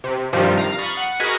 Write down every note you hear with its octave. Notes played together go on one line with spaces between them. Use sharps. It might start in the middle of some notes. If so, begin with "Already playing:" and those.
C3
G2 C3 D#3 F3 G3
F5 A#5
B5 C#6 D#6 F6 A6
F#5
F#4 G#4 A#4 B4 D#5